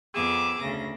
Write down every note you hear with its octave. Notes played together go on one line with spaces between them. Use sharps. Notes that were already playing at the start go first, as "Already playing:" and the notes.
F2 B3 G#4 D6 E6
D2 C#3 A#6